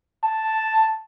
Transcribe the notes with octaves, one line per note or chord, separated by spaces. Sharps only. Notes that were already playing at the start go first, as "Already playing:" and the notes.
A5